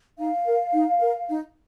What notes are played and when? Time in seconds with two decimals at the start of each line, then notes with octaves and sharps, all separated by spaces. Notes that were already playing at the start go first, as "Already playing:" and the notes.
0.18 D#4 F5
0.45 A#4
0.73 D#4
1.00 A#4
1.29 D#4